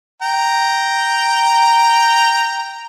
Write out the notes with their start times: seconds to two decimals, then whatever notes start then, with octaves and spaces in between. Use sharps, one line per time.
0.22 G5 A#5